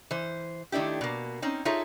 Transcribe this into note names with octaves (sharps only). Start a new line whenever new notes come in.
E3 C5
D#3 A3 D4 E4 G4
B2 A#3
C4 C#4 D#4
D#4 F4 G#4 A4 C#5 E5